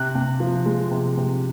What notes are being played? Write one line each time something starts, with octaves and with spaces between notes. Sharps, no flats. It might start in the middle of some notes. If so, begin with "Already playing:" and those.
Already playing: C3 F#6
C3
F3
G#3
C3
C3